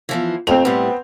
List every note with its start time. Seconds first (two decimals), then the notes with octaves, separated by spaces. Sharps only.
0.09 E3 F3 B3
0.47 F2 A3 C4 F7
0.65 A2 G3 B3